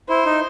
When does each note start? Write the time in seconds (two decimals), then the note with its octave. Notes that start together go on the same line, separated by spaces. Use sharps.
0.09 E4 C5
0.25 D#4